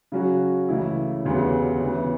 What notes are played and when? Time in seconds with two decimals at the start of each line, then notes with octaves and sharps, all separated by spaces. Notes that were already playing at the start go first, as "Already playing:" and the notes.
0.12 C#3 F#3 C#4 F#4
0.69 C#2 C#3 E3 A3 E4
1.24 E1 D2 C#3 G3 B3
1.80 D2 C#3 E3 B3